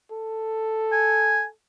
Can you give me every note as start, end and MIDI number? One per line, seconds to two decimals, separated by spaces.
0.11 1.53 69
0.92 1.44 80